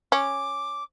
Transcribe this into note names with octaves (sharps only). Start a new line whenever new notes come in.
C#4 D6